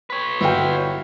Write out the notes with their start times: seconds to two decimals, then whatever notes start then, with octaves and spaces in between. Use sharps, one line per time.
0.10 B4 C#5
0.41 G1 E4 F#4 F5 G5